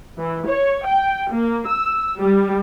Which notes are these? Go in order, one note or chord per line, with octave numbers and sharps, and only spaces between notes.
E3
C#5
G5
A#3
E6
G3